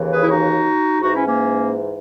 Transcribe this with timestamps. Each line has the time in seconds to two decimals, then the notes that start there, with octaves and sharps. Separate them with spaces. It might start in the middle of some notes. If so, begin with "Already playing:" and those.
Already playing: D#2 C#3 E3
0.12 G#4 B4
0.22 E4
0.29 D#4 F#4
1.01 G#2 E3 D#4 F#4
1.13 C#4 E4
1.26 A#3 C#4